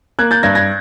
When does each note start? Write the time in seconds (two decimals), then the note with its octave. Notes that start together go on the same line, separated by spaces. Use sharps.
0.19 A#3 F#6 G#6
0.31 G6 A6
0.43 G2 G#6 A#6
0.55 G#6 A#6